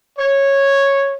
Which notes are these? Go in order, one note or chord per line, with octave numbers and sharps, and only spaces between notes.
C#5